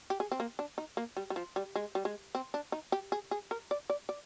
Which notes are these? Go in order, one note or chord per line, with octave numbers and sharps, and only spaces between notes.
G4
G#4
C4
A#3
D4
D#4
A#3
G3
G3
F3
G3
G#3
G3
G#3
C4
D4
D#4
G4
G#4
G#4
A#4
D5
D5
D5